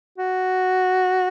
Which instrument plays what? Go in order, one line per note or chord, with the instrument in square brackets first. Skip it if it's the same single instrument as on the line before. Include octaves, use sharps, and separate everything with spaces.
[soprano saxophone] F#4